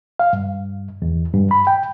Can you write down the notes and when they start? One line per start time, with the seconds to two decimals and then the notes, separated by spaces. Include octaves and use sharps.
0.19 F5
0.33 G2
1.02 E2
1.34 G2
1.51 B5
1.67 G5